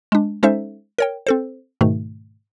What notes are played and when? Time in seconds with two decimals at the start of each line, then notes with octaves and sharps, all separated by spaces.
0.12 G#3 D4
0.43 G#3 C#4 D#4 A4 C5 E5
0.98 A#4 C#5 G5
1.27 C4 A4 C5
1.81 G#2 B2 D#3 A3